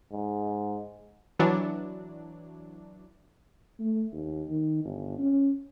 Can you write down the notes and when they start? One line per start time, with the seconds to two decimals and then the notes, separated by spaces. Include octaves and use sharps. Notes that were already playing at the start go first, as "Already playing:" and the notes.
0.12 G#2
1.39 E3 F#3 D4
3.80 A3
4.12 D#2
4.49 D#3
4.85 G1
5.18 C#4